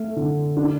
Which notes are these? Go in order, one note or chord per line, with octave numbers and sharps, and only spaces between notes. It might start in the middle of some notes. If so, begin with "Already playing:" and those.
Already playing: A3
D3
D4